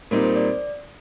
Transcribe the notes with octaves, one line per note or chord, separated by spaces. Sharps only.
A#2 G3 C4 D#4 A#4
C5
D5